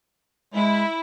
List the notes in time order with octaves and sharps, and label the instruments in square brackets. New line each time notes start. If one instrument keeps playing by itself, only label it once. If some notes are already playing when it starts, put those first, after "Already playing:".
[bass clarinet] G#3 [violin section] E4